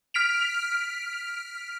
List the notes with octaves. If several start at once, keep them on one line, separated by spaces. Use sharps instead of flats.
F6 B6 D7 F7